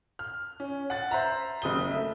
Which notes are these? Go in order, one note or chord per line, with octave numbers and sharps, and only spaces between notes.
F6
C#4
F#5 A6
C5 E5 A#5
F#1 D#6 G7
A3 E5